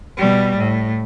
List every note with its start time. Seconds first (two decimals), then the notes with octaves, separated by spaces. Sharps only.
0.18 B2 G3
0.57 A2